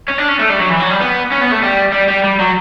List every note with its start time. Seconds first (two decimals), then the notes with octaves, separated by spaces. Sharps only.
0.08 C#4
0.18 D4
0.29 C#4
0.39 A3
0.50 G3
0.60 F#3
0.70 E3
0.80 F#3
0.90 G3
1.01 B3
1.32 C#4
1.42 B3
1.52 A3
1.63 G3
1.93 G3
2.08 G3
2.24 G3
2.39 F#3